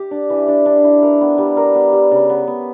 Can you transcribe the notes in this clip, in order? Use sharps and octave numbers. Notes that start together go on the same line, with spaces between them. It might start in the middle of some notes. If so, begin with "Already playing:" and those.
Already playing: G4
D4
E3
D4
D4
E4
A#4
B3
G3
A#4
B3
G3
C#3
B3
B3